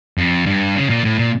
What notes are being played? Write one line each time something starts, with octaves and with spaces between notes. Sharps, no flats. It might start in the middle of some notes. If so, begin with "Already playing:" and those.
F2
G2
C#3
A#2
A2
A#2